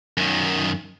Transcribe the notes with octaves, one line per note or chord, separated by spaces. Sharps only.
F#2 D#3